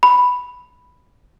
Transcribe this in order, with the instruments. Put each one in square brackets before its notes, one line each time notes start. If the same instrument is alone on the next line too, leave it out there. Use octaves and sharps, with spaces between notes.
[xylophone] B5